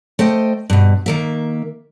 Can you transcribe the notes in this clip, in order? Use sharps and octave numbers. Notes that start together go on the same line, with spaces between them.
A3 C5 D#5 G5
G2 B2
D#3 A#3 E5